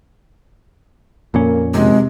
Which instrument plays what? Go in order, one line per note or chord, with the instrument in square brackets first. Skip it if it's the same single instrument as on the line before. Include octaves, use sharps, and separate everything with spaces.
[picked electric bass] F2 A#2 C#4 [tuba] A#3
[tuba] G#1 [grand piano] C3 [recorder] G#3